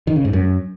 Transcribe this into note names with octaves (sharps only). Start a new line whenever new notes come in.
D#3
C#3
G#2
F#2